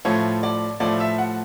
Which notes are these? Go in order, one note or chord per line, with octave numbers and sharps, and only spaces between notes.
A2 F3 A3 C#5
D5
A2 F3 A3 D5
E5
F#5